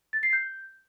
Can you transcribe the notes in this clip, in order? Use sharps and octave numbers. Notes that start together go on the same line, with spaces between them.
A6
C7
G6